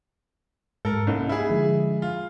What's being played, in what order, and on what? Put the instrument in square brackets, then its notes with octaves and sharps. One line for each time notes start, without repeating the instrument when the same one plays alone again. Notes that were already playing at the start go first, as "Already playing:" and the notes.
[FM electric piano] G#2 [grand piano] A4 A#4
[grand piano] C2 [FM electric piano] A#3 C#4 D#4
[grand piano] E4 G#4
[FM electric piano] D3 F3 G#3
[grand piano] F4